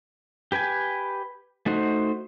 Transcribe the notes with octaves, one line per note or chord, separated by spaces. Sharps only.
G4 B4 G5 G#5
A3 D#4 F#4 C5